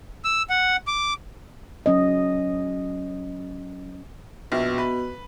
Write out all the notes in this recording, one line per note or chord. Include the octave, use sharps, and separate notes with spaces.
E6
F#5
D6
F#3 C#4 D#5
A#1 B2
B4